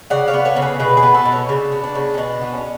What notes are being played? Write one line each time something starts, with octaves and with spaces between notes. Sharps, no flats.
C#3 D5 F#5
C#5 F5
B3
A4 C#5
C#3
G#4 B4
B2 G#4 B4
G#4 B4
B3
F#4 A4
B2
C#4
C#3 D4
B3
D4
C#3
C#4
B2 D4
B3
C#4